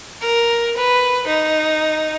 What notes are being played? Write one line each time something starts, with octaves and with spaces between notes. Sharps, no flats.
A#4
B4
D#4